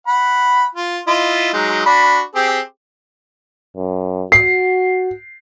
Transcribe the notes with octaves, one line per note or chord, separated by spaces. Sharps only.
F#5 B5
F4
E4 F4 D#5
F#3 G#3 D#4
D4 F#4 B5
C4 G4 G#4
F#2
F#4 C7